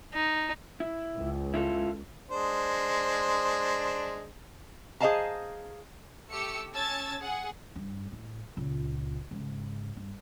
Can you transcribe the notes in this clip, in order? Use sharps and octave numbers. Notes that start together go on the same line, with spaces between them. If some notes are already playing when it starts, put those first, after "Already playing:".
D#4
E4
C#2
E4 F4 A4
G#3 D4 C5
G#4 C5 D#5 F5 A5 A#5
A3 G4 E6 C#7
C#4 A5 E6 G#6 A6
G#4 F#5
G2
A2
C#2 A#2
G#2 C#3
G2